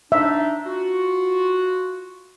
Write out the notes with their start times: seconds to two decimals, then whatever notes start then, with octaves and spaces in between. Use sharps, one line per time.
0.12 D4 D#4 E5
0.66 F4 F#4